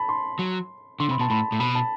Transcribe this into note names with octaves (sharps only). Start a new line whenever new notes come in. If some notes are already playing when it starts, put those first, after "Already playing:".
Already playing: A5 B5
C6
F#3
D3 C6
C3 B5
B2 A5
A2 B5
A2
B2 B5
A5